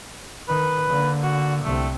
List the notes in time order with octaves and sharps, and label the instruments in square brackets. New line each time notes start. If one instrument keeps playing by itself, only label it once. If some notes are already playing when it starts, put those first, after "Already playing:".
[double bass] D#3 [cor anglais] B4
[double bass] D3 A#3
[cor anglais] F#4
[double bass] C2 C4 [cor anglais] A3